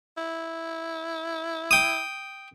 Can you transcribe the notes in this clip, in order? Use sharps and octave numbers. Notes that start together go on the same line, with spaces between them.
E4
G5 D#6